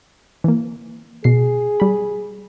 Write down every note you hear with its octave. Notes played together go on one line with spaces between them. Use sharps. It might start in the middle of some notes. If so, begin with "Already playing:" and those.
E3 A#3
B2 G#4 C7
G3 B5